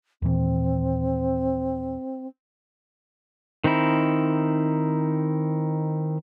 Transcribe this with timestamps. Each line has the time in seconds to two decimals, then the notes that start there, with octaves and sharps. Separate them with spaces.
0.22 D#2 A#2 E3 C4
3.64 D#3 C4 D#4 E4